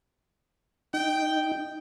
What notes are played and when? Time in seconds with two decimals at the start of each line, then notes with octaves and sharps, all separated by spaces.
0.94 D#4 G5